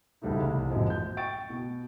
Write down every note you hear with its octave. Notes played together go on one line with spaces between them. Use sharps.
E1 C#2 G#2 G3 A3 E4
C2
D#1 A1 F#2 F3 G#3 C4
G6
G5 C#6 A6 D7
B2